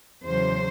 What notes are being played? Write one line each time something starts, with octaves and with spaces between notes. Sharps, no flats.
E2 C#3 F#3 C5